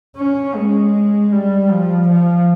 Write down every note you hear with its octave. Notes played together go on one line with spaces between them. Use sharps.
C#4
G#3
G3
F3
F3